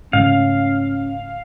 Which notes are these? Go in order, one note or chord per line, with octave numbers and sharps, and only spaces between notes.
G#2 C#3 A3 C#4 F5